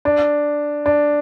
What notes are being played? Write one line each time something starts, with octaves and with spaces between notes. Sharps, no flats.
D4
D4